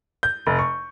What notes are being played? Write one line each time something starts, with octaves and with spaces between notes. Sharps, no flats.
G6
F1
C#6